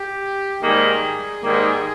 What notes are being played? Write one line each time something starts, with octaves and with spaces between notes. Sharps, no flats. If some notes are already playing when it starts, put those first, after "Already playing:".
Already playing: G4
G#2 D#3 G3 A#3 G#4
G#2 D#3 G3 A#3